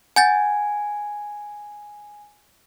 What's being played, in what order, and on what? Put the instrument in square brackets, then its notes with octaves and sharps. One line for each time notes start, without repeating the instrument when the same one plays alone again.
[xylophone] F#5 G6 A6 [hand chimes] G#5